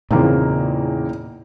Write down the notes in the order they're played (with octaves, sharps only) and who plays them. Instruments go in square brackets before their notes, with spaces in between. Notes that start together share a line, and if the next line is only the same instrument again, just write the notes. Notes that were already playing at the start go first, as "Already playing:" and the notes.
[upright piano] E2 C#3 [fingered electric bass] A#2 [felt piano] A#3 C4 D#4